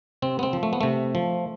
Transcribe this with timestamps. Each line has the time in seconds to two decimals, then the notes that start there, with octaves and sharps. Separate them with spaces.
0.22 C3 C4
0.39 B3
0.43 C4
0.53 F3
0.63 A3
0.73 B3
0.81 C3 A3
1.15 F3